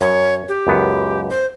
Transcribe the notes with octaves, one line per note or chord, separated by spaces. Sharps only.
F#2 C#5
G4
C#2 F#2 B3
C5